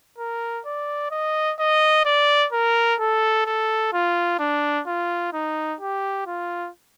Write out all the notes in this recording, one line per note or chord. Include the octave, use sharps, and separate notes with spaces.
A#4
D5
D#5
D#5
D5
A#4
A4
A4
F4
D4
F4
D#4
G4
F4